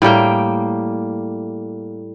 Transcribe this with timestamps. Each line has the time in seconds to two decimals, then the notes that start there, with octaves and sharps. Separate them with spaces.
0.02 A2 G3 A#3 G5